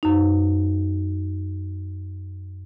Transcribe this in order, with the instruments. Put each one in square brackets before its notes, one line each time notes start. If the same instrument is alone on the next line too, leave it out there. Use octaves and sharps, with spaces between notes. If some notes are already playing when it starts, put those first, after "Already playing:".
[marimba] F#2 D#4